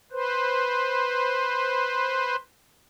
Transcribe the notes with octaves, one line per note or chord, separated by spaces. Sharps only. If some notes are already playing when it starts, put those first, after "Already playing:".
B4 C5